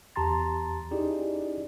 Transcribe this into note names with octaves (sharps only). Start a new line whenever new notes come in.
E2 G4 A5 A#5 C6 A6
C#4 D#4 E4 G4 G#4 D5